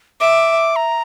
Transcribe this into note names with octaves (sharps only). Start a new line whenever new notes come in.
E5 D6
A#5